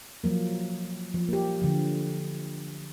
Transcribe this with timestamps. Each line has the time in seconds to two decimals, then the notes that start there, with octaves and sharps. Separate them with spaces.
0.24 F3 F#3 A#3
1.14 F3
1.29 A#3 G4
1.62 D3 F3